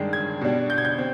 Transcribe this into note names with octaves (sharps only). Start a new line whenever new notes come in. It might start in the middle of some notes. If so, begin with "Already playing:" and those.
Already playing: G2 D#3 G#3 D4
G#6
B2 G3 D4
G6
G#6
G6
C4